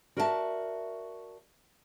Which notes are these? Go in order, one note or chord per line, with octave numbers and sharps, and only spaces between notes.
F#4 A#4 D5 E5 F#5 A5